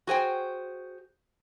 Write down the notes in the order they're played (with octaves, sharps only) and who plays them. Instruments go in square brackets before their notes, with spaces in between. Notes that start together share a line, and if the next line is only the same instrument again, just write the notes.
[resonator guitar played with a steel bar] F#4 G#4 C5 G5